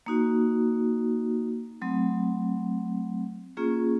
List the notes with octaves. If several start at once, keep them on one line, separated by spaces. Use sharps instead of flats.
A#3 D#4 F#4
F#3 A3 C4
A#3 C#4 F4 G#4